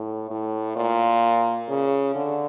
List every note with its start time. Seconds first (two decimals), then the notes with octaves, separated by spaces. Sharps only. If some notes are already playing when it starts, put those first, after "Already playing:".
Already playing: A2
0.30 A2
0.76 A#2
1.69 C#3
2.15 D3